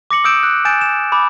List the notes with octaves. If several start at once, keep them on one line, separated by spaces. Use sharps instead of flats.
D6 A#6 C#7 F#7
D#6 E6 G6 D7 E7
F#6
G#5 G6 A6 D7 E7
E7
B5 D6